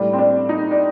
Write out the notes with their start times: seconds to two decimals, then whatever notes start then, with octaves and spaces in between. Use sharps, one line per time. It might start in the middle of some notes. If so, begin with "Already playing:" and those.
Already playing: A1 A2 G3 D4
0.13 C4
0.18 D4
0.49 D#4
0.71 D4